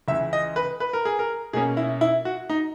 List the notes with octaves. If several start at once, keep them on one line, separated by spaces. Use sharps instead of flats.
C#2 C#3 E3 E5
D#5
B4
B4
A#4
G#4
A#4
B2 A#3 C#4 G#4
E4
E4
F#4
D#4